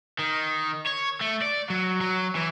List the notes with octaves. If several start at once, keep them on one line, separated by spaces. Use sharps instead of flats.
D#3
C#5
A3
D5
F#3
F#3
E3